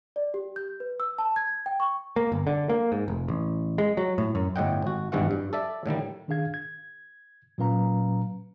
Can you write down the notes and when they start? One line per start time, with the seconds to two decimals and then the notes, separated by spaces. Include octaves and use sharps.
0.16 D5
0.34 G4
0.56 G6
0.80 B4
1.00 E6
1.18 A5
1.36 G#6
1.66 G5
1.80 C#6
2.16 A#3
2.32 G1
2.47 D3
2.69 A#3
2.92 G#2
3.08 F1
3.28 A1
3.78 G#3
3.97 F#3
4.18 A2
4.35 F#2
4.56 G1 A2 G4 D#5 F#5 G5
4.82 G#1 F#4
5.12 G#1 G2 B2 E3 F#4 F#5
5.31 G2
5.53 A4 D5 E5
5.86 A2 D3 D#3 G3
6.28 D#3 D4 G#4 F5 G#6
6.54 G#6
7.58 A#2 F#3 C#4 B4 F5 A#5